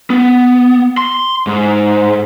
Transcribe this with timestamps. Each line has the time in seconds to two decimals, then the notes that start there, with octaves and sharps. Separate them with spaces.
0.10 B3
0.98 C6
1.47 G#2